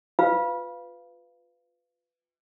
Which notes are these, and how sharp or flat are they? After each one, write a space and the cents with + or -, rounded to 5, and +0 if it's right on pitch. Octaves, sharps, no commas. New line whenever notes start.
F4 +0 B4 +20 F5 -10